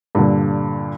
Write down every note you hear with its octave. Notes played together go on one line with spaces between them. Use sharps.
G2 A#2 D3